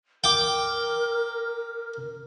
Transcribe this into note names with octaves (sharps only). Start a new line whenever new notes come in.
A#4 G5 D6